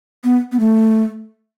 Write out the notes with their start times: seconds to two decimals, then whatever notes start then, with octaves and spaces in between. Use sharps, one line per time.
0.24 B3
0.52 B3
0.60 A3